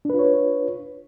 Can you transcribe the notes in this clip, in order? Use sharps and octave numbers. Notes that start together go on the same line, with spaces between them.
D4 F4 B4 C#5